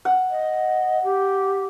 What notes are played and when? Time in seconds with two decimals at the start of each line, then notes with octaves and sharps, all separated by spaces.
0.05 F#5
0.30 D#5
1.04 G4